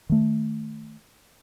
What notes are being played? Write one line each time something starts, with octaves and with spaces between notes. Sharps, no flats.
D#3 A3